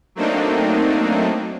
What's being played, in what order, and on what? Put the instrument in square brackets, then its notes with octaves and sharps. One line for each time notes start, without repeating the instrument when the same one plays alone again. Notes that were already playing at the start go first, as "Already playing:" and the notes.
[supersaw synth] F#3 A3 A#3 C4 D4 D#4